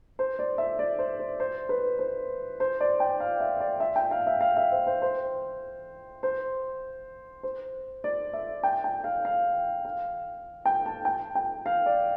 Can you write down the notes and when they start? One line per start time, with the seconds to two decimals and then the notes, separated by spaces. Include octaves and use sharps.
0.19 C5
0.39 D5
0.58 E5
0.79 D5
0.99 C5
1.19 C5
1.40 C5
1.69 B4
1.99 C5
2.60 C5
2.80 D5
3.00 G5
3.20 F5
3.40 E5
3.60 D5
3.80 E5
3.96 G5
4.11 F5
4.27 E5
4.41 F5
4.56 E5
4.72 C5
4.87 C5
5.02 C5
6.23 C5
7.43 C5
8.04 D5
8.33 E5
8.63 G5
8.84 G5
9.04 F5
9.25 F5
9.85 F5
10.65 G5
10.86 A5
11.05 G5
11.35 G5
11.66 F5
11.86 D5